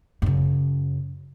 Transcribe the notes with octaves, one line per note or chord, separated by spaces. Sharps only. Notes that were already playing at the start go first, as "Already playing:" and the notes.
F#2 C#3